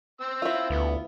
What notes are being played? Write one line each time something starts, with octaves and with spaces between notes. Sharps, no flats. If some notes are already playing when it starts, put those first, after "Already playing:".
C4 E6
E4 F4
D2 B3